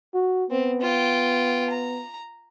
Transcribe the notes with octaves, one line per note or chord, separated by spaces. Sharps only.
F#4
B3 C4
F4 G5
A#5